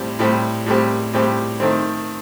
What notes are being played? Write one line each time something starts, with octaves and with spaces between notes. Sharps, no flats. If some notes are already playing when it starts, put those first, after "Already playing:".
Already playing: A2 G3 C4 G4
A2 G3 C4 G4
A2 G3 C4 G4
A2 G3 C4 G4
D#3 A3 C4